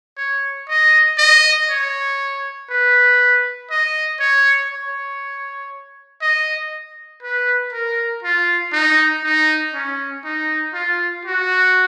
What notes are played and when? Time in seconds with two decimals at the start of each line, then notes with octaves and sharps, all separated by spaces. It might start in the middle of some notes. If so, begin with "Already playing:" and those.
0.18 C#5
0.69 D#5
1.18 D#5
1.70 C#5
2.70 B4
3.71 D#5
4.20 C#5
4.71 C#5
6.22 D#5
7.23 B4
7.72 A#4
8.23 F4
8.73 D#4
9.24 D#4
9.74 C#4
10.25 D#4
10.74 F4
11.25 F#4